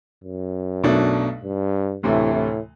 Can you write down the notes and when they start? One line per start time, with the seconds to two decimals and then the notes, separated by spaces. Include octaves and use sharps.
0.24 F#2
0.84 B1 B2 A3 D4 A4
1.44 G2
2.03 D2 A2 C3 E3 A3
2.34 A2